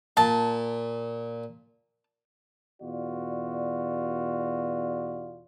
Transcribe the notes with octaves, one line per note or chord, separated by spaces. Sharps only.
A#2 A5
E2 B2 F4 F#4 D5